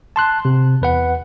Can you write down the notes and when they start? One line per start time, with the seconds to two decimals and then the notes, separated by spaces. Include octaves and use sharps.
0.16 A5 C6 F#6
0.45 C3
0.82 E2 B4 F#5